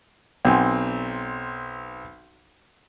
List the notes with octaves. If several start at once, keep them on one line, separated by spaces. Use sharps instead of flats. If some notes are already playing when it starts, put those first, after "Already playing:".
B1 C4 G#5